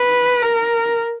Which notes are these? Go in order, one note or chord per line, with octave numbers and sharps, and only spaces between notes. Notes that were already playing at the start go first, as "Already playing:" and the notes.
Already playing: B4
A#4